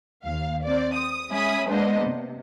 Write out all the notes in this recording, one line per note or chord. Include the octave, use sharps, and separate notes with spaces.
D#2 F5
C4 D5
D#6
G#3 C#4 E5 G#5 B5 D#6
G#3 A#3 B3 D4 C5 D#5
C3